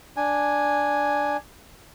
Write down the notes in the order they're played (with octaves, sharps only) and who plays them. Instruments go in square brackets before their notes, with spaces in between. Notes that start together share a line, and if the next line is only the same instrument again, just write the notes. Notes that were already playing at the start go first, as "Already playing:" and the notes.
[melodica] D4 G#5